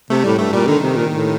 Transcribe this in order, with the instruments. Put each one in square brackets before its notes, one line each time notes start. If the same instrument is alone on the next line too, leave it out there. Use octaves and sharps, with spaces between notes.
[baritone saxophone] C3 [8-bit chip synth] A3
[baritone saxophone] A2 [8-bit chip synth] G3
[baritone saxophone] G2 [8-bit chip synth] A3
[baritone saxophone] A#2 [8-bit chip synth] G3
[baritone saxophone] D3 [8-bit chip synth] D#3
[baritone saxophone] C3
A#2
A2